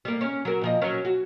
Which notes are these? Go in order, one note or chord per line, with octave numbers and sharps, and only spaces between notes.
G3 A#3
C#4
F#3 A#4
A#2 F3 D#5
F#3 C#4 A#4
F#4